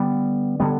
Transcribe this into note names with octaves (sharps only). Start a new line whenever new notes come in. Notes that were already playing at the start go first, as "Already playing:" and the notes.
Already playing: D3 G3 B3
D3 G3 B3